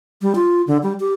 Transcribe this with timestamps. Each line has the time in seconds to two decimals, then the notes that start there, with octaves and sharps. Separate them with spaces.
0.22 G3
0.35 F4
0.67 D3
0.83 G3
1.00 G4